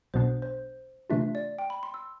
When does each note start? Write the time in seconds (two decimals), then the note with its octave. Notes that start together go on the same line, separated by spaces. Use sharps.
0.14 B1 B2 B3 D4 C5
0.42 C5
1.10 C3 E3 A3 D4 F4 E5
1.35 D5
1.59 G5
1.70 B5
1.83 C6
1.94 E6